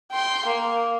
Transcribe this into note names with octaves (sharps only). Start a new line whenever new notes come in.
G5 C6
A#3